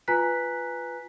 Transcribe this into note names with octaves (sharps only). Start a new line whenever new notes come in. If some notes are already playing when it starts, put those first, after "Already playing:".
F4 B4 G#5 A#5 F#6 B6